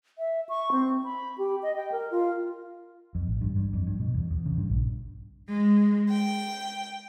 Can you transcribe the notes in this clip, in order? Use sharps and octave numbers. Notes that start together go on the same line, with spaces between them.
E5
C#6
C4
B5
G4
D#5
G5
A#4
F4
F2
A1
G2
G2
F2
G2
B2
E2
E2
C#3
G2
A#1
G#3
G5